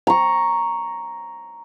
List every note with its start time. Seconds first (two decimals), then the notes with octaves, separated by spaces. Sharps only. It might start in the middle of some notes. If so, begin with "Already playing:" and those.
0.07 A#5 C#6